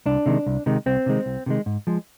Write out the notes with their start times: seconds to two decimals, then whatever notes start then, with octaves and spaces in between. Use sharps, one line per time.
0.06 C2 D4
0.26 C3 D#3 G#3
0.46 C2
0.66 C3 D#3 G#3
0.86 C2 C4
1.06 C3 D#3 G#3
1.26 C2
1.46 C3 D#3 G#3
1.66 G#2
1.87 F3 G#3